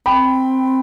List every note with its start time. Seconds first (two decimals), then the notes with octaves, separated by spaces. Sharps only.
0.06 C4 G5 B5